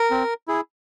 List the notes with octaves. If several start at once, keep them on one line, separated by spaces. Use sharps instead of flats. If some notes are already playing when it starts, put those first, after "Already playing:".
Already playing: A#4
C4
E4 G#4